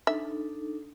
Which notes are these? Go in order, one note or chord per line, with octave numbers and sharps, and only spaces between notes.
D4 D#4 A4 E5